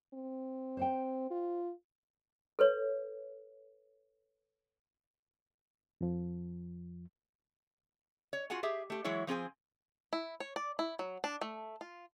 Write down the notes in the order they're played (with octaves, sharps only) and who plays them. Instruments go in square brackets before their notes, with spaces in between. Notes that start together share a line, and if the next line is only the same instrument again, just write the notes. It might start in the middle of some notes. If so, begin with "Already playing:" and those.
[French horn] C4
[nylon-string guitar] C5 F#5 G5
[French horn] F4
[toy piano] A4 B4 C#5
[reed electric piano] F2 F3
[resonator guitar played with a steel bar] C#5
F4 F#4 G#4 F#5 G#5
G4 G#4 E5
A3 G4
E3 F#3 G#3 E4 C#5
F3 C4 G#4 G#5
[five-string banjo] E4
C#5
D5
E4
F#3
D4
A3
F4